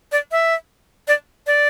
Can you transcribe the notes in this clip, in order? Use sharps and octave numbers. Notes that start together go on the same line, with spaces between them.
D5
E5
D5
D5